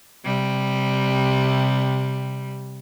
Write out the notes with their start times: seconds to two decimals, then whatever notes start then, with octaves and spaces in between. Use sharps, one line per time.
0.24 C3 G3